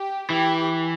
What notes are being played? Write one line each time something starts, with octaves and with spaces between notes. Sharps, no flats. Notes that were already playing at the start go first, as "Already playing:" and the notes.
Already playing: G4
E3 G4